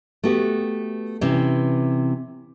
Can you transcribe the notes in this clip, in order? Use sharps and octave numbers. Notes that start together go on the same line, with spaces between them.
A3 B3 F#4 G4
C3 E3 C4 C#4